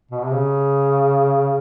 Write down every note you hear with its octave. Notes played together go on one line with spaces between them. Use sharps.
B2
C3
C#3